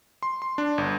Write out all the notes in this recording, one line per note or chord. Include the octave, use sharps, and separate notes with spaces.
C6
C6
D4
G1